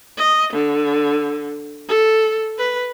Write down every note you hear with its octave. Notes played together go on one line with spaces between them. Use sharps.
D#5
D3
A4
B4